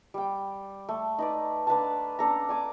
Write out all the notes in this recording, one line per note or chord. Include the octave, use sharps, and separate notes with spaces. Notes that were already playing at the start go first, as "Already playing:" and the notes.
G3 G5
A3
D#4 B4 D5
D4 B4 F5 A5
C#4 D4 A4 A#5
D5 G#5 D6